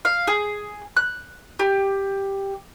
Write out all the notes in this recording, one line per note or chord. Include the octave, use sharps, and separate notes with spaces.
F5
G#4
F#6
G4